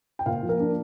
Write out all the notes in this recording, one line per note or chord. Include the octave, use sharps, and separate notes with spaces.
G5
A#2 F4 F5
F3
A#3 A#4
D4